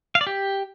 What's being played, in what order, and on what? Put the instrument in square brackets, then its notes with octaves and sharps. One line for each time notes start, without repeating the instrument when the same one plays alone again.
[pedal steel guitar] F5
D5
G4